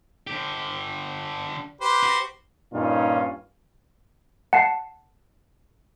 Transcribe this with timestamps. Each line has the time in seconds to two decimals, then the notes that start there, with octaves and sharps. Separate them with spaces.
0.27 D3 G4
1.81 G4 B4 C5
2.03 F#4
2.73 G2 A#2 C#4 D#4 F4
4.53 F#5 A5 C7